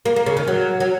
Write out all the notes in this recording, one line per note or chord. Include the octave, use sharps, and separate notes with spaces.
A#3
A#3
C#3
D#3
F#3
F#3